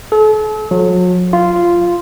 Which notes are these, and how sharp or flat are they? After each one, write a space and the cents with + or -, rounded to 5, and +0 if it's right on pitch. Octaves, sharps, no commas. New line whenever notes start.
A4 -40
F#3 -40
F4 -10